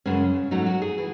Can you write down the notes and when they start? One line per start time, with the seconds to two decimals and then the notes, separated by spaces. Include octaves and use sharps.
0.06 F#2 C#3 G#3 C#4
0.51 G#2 F#3 A3 D#4
0.66 F#4
0.82 G#4
0.98 E3